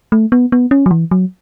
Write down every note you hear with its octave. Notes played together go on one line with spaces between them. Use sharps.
A3
B3
B3
C#4
F#3
E3
F#3